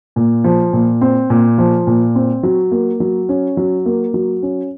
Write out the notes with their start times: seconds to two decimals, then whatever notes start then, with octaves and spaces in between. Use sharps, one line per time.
0.16 A#2
0.44 F3
0.73 A#2
1.01 C4
1.30 A#2
1.58 F3
1.87 A#2
2.15 C4
2.43 F#3
2.71 A#3
3.00 F#3
3.29 C#4
3.57 F#3
3.86 A#3
4.14 F#3
4.43 C#4